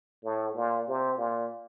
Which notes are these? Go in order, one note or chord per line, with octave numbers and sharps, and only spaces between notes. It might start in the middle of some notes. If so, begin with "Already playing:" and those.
A2
A#2
C3
A#2